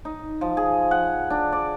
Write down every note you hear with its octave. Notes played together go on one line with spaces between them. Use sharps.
D#4
F3
G#4
F#5
D4
D5